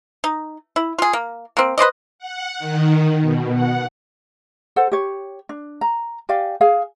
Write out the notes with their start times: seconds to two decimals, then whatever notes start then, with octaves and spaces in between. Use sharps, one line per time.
0.24 D#4
0.76 E4
0.98 F4 G#4
1.13 A#3
1.57 A#3 C4
1.78 B4 C5 D5 D#5
2.19 F#5
2.59 D#3
3.21 B2
3.55 F#5
4.76 A4 C5 F#5
4.92 G4 C#5
5.49 D4
5.81 A#5
6.29 G4 D5 F5 G#5
6.61 G#4 F5 G#5